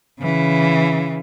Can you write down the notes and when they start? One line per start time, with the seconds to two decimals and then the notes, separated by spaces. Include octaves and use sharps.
0.20 C#3 E3